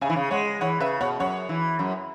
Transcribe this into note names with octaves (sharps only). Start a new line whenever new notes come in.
C#3 E5 G#5
E3
C#3
G#3 C#5 F#5
E3 C#5 F#5
C#3 B4 E5
B2 C#5 F#5
F#2 C#5 F#5
E3
F#2